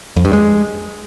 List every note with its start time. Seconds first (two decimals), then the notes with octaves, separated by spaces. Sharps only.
0.16 F2
0.25 G2
0.33 G#3